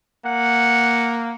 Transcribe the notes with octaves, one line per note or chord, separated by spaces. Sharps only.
A#3 F#5